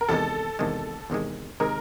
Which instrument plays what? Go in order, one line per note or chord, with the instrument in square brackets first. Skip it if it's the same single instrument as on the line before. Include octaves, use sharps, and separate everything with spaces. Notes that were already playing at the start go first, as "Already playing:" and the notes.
[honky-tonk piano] A#4
[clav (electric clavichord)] E2 C3 D#3 G#3 [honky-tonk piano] A4
[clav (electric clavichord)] E2 C3 D#3 G#3
E2 C3 D#3 G#3
[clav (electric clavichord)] C3 D#3 G#3 [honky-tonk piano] A#4